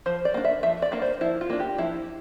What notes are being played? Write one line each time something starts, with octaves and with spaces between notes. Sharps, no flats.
F3 C5
D5
A#3 D4
E5
F3 E5
D5
A#3 D4
C5
F3 E4
F4
A#3 D4
G4
F3 E4